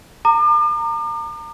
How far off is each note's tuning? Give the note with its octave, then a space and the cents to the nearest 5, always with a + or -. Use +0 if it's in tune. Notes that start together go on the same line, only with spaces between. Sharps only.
A#5 -30 D6 +40